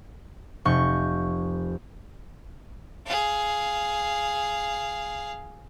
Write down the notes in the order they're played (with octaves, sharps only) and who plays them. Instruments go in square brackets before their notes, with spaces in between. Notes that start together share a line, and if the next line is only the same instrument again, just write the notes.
[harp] F1 C#6 G6
[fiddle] G#4 F5